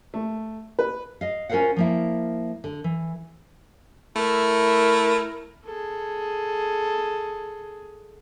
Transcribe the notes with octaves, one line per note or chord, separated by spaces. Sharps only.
A3
B4
D#5 F5
C#4 F4 A#4 C5 F5 F#5
F3 A#3 E4
D3
E3
A3 E4 A#4
G#4 A4